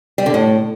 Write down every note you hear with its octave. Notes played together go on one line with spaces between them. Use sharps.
G3
D3
A2